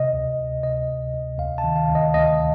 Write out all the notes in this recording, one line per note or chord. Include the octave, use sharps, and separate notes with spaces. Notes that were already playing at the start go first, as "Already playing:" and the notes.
Already playing: C3 D#5
D2
D2
C3 D#5
D2
D2
D2 F5
A5
D#3
F5
D2
D#5
D2 D#5